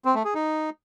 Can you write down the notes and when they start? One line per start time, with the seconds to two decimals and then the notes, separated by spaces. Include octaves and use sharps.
0.05 C4
0.15 A3
0.25 G#4
0.34 D#4